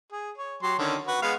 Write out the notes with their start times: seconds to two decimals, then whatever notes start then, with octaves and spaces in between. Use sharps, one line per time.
0.12 G#4
0.38 C#5
0.63 F#3 G4 C6
0.79 D3 D#3 C#4
1.07 F#4 B4
1.22 G#3 B3 F5